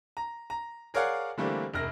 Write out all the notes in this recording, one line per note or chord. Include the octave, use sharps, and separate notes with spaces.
A#5
A#5
G#4 A#4 C#5 D5 F5 F#5
D3 E3 G3 A3 A#3 C4
E1 C2 A#4 F6 A#6